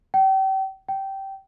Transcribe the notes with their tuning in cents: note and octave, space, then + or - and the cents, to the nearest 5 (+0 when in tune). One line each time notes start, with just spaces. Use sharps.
G5 -35
G5 -15